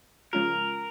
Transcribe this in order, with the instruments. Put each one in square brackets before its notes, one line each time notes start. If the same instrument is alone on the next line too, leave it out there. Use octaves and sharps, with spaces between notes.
[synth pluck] C#3 F3 G#3 C#4 F4 [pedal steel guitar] A#4